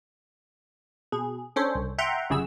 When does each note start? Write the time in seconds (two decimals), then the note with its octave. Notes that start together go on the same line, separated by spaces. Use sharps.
1.12 B2 G#4
1.56 C#4 D4 A4 C5 C#5
1.75 C2
1.98 E5 F#5 G5 A#5 C6
2.30 G1 F#2 C#3 G#4 E6